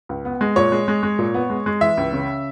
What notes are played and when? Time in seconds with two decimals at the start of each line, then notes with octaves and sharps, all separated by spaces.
0.09 C#2
0.25 B3
0.41 G#3
0.56 A#2 C#5
0.72 G#3
0.88 G#3
1.03 G#3
1.19 A#2
1.34 B3
1.50 G#3
1.66 G#3
1.81 E3 E5
1.97 C#2
2.13 C#3